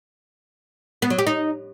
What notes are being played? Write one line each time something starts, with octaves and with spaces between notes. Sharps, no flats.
B3
F#3
G4
D#4